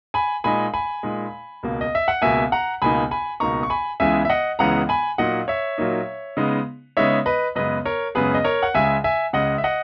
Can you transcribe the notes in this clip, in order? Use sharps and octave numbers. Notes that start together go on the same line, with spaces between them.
G#5 B5
A#2 G#3 D#4 G#5 B5
G#5 B5
A#2 G#3 D#4
C#2 B2 A#3
D#5
E5
F#5
C#2 B2 A#3 E5 G#5
F#5 A#5
C#2 B2 A#3 D#4 G#5 B5
G#5 B5
C#2 B2 A#3 D#4 A#5 C#6
C#6
G#5 B5
C#2 C#3 E3 G#3 B3 E5 G#5
E5
D#5 F#5
C#2 C#3 E3 G#3 B3 F#5 A#5
G#5 B5
A#2 F#3 A#3 D#4 D#5 F#5
C#5 E5
A#2 F#3 A#3 D#4
C#3 G#3 B3 D#4
C#3 G#3 B3 D#4 C#5 E5
B4 D#5
F#2 C#3 G#3 B3 B4 D#5
A#4 C#5
F#2 C#3 G#3 B3 G#4 B4
D#5
A#4 C#5
F#5
C#2 C#3 G#3 E5 G#5
E5 G#5
C#2 C#3 G#3 D#5 F#5
E5
D#5 F#5